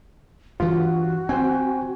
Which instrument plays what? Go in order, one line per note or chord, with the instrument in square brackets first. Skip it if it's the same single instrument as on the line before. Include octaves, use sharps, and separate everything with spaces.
[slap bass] G2 E3 [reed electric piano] F4 [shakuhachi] F#4
[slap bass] C4 [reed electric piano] C5 G5 G#5